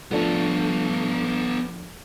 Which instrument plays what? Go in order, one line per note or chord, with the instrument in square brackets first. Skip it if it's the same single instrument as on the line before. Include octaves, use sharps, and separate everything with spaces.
[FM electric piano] F3 A3 D4 [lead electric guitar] B3 A4